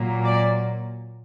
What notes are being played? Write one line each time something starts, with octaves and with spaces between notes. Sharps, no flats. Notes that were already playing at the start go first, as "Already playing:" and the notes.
Already playing: A#2 F#3 A#3
D5